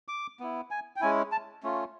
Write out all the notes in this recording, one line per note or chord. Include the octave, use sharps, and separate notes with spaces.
D6
B3 E4
G#5
G5
G#3 C#4 E4 G#5
A5
A3 C#4 F4